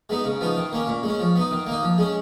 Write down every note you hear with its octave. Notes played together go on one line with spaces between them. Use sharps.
G#3 B3 D#4
C#3
F3 B3 D#4
D#3
A#3 C#4
A#2
G#3 C#4
F3
B3 D#4
D#3
A#3 D#4
F3
G#3 C#4